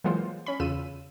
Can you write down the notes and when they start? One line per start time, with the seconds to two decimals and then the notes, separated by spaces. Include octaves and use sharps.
0.04 E3 F#3 G#3 A#3 F4 C5
0.46 C#4 B5
0.60 E2 C#3 F4 E6 D#7